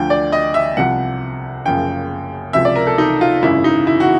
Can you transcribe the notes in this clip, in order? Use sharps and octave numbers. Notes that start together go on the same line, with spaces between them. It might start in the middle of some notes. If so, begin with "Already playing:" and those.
Already playing: D2 D3 F3 G5
D5
D#5
E5
C2 C3 F3 F#5
F#1 F#2 C#3 F3 G5
C#2 C3 F3 E5
D5
A#4
A4
D#4
F4
G#1 F#2 C#3 E3 E4
D#4
E4
F#4